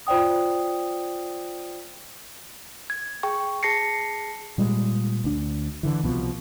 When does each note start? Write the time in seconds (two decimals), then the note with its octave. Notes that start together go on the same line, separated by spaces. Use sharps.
0.07 F4 C5 D5 G5 D#6
2.90 G#6
3.23 G#4 G5 C#6
3.63 G#4 A5 A#6 C7 C#7
4.58 A#2 G3 G#3
5.24 D2 D4
5.83 D3 E3
6.03 C2 B2 F3